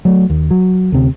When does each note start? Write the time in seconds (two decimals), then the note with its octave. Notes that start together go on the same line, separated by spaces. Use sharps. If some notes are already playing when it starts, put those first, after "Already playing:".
0.05 F#3 A3
0.30 D#2
0.51 F#3
0.92 D2 C3